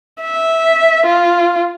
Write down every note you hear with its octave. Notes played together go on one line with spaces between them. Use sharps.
E5
F4